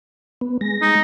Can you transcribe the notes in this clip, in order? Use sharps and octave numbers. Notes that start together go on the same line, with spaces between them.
B3
G#3 A#6
D#4